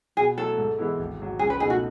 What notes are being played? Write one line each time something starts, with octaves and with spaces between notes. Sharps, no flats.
B2 G#4
F#3 A3 E4 A4
G#2
E3 G#3 B3 E4
G#1
G#2 F#3
C#2 G#4
B4
B2 A3 D#4 G#4
F#4